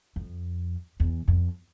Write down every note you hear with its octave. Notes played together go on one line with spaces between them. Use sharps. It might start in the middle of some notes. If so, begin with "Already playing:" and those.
F2
E2
F2